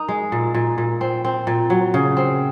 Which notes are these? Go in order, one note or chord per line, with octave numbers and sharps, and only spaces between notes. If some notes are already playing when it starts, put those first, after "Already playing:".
Already playing: D#4 A#4
G#3
A#2
A#2
A#2
C4
C4
A#2
F#3
C#3
C4